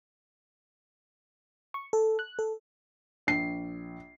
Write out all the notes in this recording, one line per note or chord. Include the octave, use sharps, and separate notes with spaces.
C#6
A4
F#6
A4
A#1 C7